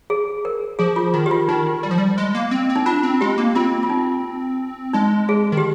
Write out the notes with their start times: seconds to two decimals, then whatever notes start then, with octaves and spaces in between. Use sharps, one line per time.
0.10 G#4
0.45 A#4
0.79 F3 G#4
0.96 F4
1.14 D#3 F4
1.26 G4
1.31 F4
1.48 D#3 D#4
1.83 G3
1.91 F3
1.98 G3
2.18 G#3
2.35 A#3
2.51 C4
2.70 C4
2.76 D#4
2.86 D4 F4
3.03 C4
3.21 G#3 G4
3.38 A#3
3.55 C4 F4
3.83 F4
3.90 D#4
4.93 G#3 D#4
5.29 G#4
5.52 D#3
5.57 G4